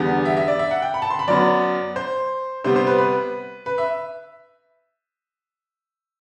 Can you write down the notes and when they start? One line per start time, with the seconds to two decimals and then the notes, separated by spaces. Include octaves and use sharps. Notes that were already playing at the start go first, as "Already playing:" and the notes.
Already playing: E2 D3 G3 B3
0.25 E5
0.37 E5
0.48 D5
0.59 E5
0.71 F#5
0.82 G5
0.94 B5
1.02 A5
1.10 C6
1.19 B5
1.28 F#2 F#3 B3 D5
1.96 C5
2.64 C3 G3 B3 C5
2.76 C5
2.87 B4
2.98 B4
3.66 B4
3.78 E5